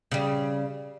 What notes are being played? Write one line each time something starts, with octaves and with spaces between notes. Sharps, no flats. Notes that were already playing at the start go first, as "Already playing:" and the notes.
C#3 G3